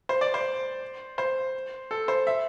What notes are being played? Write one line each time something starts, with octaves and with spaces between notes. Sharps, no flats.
C5
D5
C5
C5
A4
C5
E5